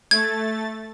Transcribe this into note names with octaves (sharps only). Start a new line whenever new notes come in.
A3 G#6 A6